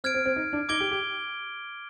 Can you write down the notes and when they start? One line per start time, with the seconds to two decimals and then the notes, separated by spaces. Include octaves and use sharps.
0.04 C4 F6 G#6 D7
0.14 C4
0.25 C4
0.36 D#4
0.53 D4
0.69 D#4 D6 G#6 D7 G7
0.80 G4
0.91 G4